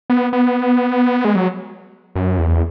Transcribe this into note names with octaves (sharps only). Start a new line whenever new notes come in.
B3
B3
G#3
F#3
F#2
E2